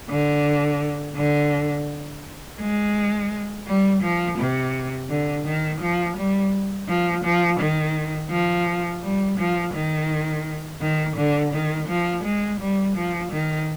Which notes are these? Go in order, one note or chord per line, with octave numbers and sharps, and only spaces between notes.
D3
D3
G#3
G3
F3
C3
D3
D#3
F3
G3
F3
F3
D#3
F3
G3
F3
D#3
D#3
D3
D#3
F3
G#3
G3
F3
D#3